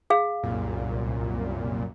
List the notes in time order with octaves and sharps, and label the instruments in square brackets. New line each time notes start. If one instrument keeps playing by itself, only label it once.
[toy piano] G#4 F5
[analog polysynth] C2 F#2 A#2